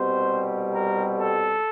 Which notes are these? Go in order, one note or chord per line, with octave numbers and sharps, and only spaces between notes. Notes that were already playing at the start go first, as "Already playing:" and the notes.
Already playing: C2 B2 G3 C4 C5
A#4
A4